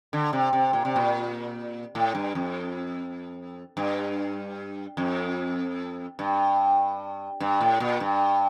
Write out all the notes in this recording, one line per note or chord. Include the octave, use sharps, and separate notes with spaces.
D3
C3
C3
A#2
C3
A#2
A2
G2
F2
G2
F2
G2
G2
A2
A#2
G2